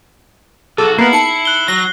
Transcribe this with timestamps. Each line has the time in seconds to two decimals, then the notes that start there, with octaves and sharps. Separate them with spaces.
0.78 B1 F#4 G#4 A4
0.99 A#3 B3 E4 C7 F#7
1.13 D#4 A5 C#7
1.45 F#6 G7
1.68 F#3 A#6